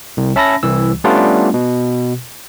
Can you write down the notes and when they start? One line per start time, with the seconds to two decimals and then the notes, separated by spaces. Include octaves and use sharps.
0.17 C2
0.36 C#4 E5 A5 B5 E6 A#6
0.63 C2 E3 E6
1.04 G3 A3 B3 C#4 D4 F4
1.54 B2